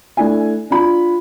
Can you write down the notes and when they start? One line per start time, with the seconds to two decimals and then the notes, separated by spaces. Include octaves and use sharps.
0.17 A3 D4 E4 G#5
0.70 D4 F4 B5